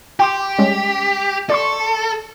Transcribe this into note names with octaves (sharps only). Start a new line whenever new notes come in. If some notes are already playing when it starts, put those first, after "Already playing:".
G4 G5 C6 D6
G3 G#3 C#4
A4 D5 C6 C#6